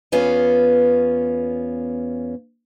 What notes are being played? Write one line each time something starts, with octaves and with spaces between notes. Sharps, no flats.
E2 B3 C#4 F4